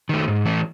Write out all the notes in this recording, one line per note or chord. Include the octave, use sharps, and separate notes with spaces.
D#3 A3
G#2
E3 A3